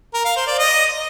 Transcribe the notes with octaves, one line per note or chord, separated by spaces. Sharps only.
A#4
F5
C5
D5
D#5